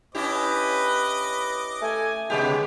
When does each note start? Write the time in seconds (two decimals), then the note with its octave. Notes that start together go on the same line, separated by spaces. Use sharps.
0.15 C#4 E4 G4 B4 D#5 D6
1.82 A3 G#5
2.30 C3 G#3 B3 C#4 G4